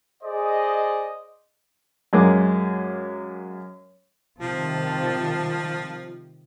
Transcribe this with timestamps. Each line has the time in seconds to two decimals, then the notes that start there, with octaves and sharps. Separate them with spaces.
0.23 G#4 C5 D5 D#5
2.13 F#2 G#3 A#3 D6
4.40 C3 D#3 F3 G3 F4 A5